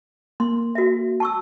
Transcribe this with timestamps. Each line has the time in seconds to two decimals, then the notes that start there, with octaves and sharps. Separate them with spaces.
0.40 A#3 C6
0.75 F#4 E5
1.20 A5 C#6 E6